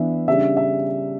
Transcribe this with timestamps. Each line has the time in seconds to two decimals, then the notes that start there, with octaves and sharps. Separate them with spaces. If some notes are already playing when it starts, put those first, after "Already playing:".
Already playing: E3 B3 D4 E5
0.28 C#3 G3 D4 E5
0.57 E5